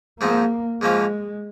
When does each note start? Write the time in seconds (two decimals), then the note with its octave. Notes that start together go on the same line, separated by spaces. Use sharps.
0.20 G#2 F3 A#3 C4 D#4
0.81 G#2 F3 G#3 A#3 C#4 F4